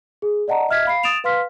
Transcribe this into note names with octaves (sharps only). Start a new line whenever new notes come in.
G#4
D5 D#5 F#5 A5 A#5
D#5 E5 F6 G#6 B6
F5 B5 C7
D#6 A6 D7 E7 F7
B4 F5 C6 F6 B6